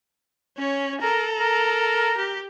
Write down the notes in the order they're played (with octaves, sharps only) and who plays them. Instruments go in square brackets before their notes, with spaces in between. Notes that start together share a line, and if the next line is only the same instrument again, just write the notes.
[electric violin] C#4 C#5
[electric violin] A4 A#5 [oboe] A#4
[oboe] A#4
[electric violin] G4